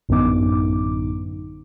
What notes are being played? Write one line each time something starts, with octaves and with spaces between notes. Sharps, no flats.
A1 F#2 D3 B3 D#4 D6